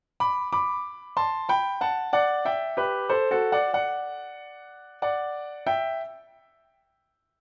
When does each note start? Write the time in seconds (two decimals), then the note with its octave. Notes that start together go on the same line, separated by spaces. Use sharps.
0.20 B5 D6
0.52 B5 D6
1.17 A5 C6
1.49 G5 B5
1.81 F#5 A5
2.13 D5 F#5
2.45 E5 G5
2.77 G4 B4
3.09 A4 C5
3.31 F#4 A4
3.52 D5 F#5
3.73 D5 F#5
5.02 D5 F#5
5.67 E5 G5